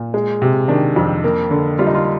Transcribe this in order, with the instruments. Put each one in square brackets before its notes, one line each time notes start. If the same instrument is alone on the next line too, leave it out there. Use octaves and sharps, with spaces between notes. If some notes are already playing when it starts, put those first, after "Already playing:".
Already playing: [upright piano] A#2
G#3
C3
D#3 D4
F2
A#3
D3
G3 F4
D#4
F4